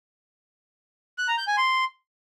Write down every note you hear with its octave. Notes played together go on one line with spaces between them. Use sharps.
F#6
A#5
G6
G#5
C6